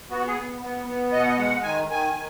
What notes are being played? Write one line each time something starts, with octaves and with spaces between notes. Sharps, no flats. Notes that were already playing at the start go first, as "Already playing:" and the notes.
B3 F#4
G#4
B3
B3
B3
B2 D#5
F#5
D#5
G#3 F#5
D#3 G#5
D#3 G#5
D#3